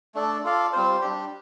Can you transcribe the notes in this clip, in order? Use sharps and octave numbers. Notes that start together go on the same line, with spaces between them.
A3 D4 A4 D5
F4 A4 D5 F5
G3 C4 F4 C5
G3 D4 G4